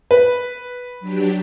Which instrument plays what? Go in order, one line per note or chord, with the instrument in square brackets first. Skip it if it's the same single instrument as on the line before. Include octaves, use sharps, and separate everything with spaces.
[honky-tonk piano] B4
[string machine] F#3 D4 G4